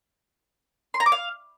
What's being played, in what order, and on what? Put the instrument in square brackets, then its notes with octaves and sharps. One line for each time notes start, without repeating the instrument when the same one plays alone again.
[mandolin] C6
A#5
D6
F5